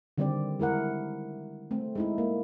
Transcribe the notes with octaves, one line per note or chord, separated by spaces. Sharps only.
D3 D#3 G3 C4 G4 D5
G#3 E4 A#4 F#5
A3 C4
G#3 D#4 E4
A#3